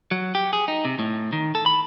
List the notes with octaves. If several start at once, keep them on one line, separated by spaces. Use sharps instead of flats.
F#3
G4
G#4
D#4
C3
A2
D#3
A4
B5